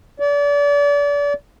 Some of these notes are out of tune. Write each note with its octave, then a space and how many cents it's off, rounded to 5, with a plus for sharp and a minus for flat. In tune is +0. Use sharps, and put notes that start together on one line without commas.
D5 -35